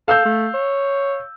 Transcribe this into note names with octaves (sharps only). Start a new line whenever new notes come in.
A4 F5 E6 G6
A3
C#5